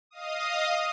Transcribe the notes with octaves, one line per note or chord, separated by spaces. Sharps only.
D#5 F5 D#6